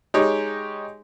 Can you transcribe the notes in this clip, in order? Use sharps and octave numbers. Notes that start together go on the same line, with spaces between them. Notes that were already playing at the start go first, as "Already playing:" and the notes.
G#3 D#4 G4 C#5